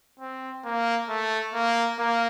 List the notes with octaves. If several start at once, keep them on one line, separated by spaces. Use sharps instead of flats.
C4
A#3
A3
A#3
A#3